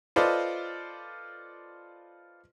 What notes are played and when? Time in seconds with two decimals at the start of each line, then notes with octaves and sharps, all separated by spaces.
0.16 F4 A4 B4 C5 D5 D#5